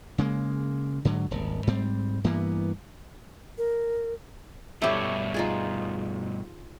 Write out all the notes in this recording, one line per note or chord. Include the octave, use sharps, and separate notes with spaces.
C#3 G#3 A#3
G#2 D3 F#3
D#1 G#1
G#2 G3 C4
G2 E3 A#3 B3
A#4
G2 B2 E4 G4 A4 C#5
D#4 F4 G#4